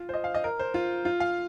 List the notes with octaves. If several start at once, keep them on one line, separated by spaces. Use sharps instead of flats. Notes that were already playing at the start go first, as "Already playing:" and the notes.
Already playing: F4
C5
D#5
F5
D#5
A#4
C5
F4
F4
F5